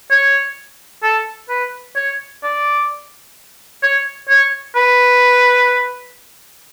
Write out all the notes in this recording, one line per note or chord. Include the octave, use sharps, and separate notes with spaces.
C#5
A4
B4
C#5
D5
C#5
C#5
B4